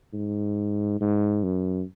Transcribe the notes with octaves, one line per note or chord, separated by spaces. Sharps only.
G#2
G#2
F#2